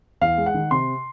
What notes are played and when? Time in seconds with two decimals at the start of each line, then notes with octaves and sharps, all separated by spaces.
0.21 E2 F5
0.38 G#3
0.46 F#5
0.54 D#3
0.71 C3 C6